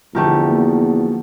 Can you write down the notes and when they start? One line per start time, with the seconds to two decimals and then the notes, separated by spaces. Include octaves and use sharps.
0.15 E2 B2 D3 F3 A3 G4 A#4
0.50 A#3